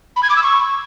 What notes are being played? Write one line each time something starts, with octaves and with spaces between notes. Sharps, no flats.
B5
G#6
D6
E6
C#6